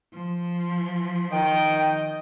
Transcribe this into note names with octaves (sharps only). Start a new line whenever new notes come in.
F3
D#3 D#5 G5